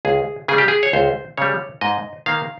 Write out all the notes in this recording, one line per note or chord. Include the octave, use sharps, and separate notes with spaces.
C#2 G#4
C#3 G#4
G3 G4
G#4
C#5
C#2 C5
C#3 G3 C#5
G#2 D#5
D#3 A#3 F5